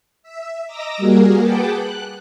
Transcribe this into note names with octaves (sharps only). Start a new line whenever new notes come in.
E5
D#5 A#5 D6 E6 A#6
G3 A#3 F#4 G#4 A#4
G#4 B4 F#5 G5 A5 D6
F#6